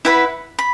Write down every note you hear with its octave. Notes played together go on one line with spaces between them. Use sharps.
E4 B4 F#5 B5
B5